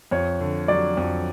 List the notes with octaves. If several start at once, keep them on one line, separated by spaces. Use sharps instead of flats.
F2 C#5
D3
F#3 D5
F2